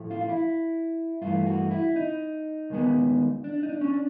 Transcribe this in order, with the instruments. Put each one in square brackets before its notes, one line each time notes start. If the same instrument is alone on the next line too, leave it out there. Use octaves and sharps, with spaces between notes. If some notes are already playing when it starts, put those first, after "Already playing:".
Already playing: [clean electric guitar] A2 F3 A3
F4
F4
E4
G2 E3 A3 F4
F#4
E4
D#4
D#2 D#3 G#3 B3
D4
D#4
D4
C#4
D4